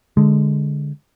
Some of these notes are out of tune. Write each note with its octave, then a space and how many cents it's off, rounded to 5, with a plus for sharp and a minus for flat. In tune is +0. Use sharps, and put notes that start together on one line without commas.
D3 +0 G#3 +0